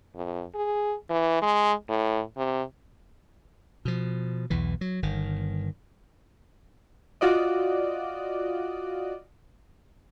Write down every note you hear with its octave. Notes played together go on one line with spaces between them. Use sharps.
F2
G#4
E3
G#3
A2
C3
B2 F3
B1 E2 E3
F#3
G1 D#3
F4 F#4 D5 D#5